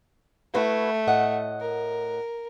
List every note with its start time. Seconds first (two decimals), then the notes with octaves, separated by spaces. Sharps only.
0.54 A3 E4 F#4 B4
1.07 A2 D#5 F#5
1.60 A#4